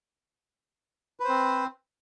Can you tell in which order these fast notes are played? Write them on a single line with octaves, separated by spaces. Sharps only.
B4 C5 C4